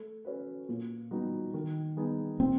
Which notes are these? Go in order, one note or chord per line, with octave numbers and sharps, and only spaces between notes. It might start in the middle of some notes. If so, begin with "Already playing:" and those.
Already playing: A3
C#4 F#4 B4
A#2
G3 B3 D#4 F#4
D#3
G3 B3 D#4 G#4
A#2 C4